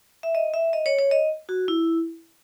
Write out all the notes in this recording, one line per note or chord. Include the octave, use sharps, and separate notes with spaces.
E5
D#5
E5
D#5
C#5
C#5
D#5
F#4
E4